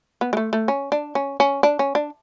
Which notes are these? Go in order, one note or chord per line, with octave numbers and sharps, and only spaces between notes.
B3
G#3
A3
A3
C#4
D4
C#4
C#4
D4
C#4
D4